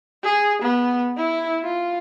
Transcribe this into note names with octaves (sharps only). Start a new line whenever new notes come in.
G#4
B3
E4
F4